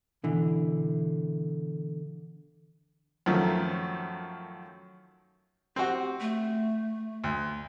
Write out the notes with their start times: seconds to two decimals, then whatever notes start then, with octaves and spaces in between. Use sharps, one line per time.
0.24 B2 D3 E3
3.26 F#2 D#3 F3 A3
5.76 C4 F#4 G4
6.20 A3
7.24 D2